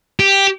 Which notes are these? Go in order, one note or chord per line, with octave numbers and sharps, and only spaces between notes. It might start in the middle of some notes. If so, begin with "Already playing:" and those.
G4